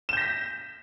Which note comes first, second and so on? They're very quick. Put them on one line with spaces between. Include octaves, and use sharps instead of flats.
E7 G6 A#6 B6